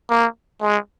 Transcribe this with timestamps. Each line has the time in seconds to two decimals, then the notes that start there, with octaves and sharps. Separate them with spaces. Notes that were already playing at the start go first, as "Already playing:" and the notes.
0.10 A#3
0.61 G#3